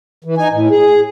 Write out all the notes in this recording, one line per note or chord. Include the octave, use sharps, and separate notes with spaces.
E3
D#4 G#5
A2
G#4